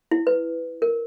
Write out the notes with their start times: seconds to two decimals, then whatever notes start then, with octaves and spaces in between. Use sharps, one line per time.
0.11 E4
0.27 B4
0.82 A#4